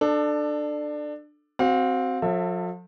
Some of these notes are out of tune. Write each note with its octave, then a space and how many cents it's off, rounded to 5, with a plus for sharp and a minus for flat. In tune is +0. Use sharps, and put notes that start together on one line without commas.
D4 +20 A4 +0
C4 +0 F#4 +20 F5 +35
F3 +45 A4 +20 E5 +0